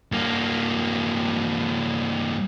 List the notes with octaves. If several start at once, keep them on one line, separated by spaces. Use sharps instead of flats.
G2 A#3